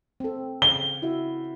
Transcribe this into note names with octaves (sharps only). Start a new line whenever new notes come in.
C4 A4
C#3 F5 G7
E4 F#4 E5